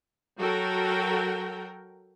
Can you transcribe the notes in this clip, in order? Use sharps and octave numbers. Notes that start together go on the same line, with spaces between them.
F#3 F#4 A4 A#4 G5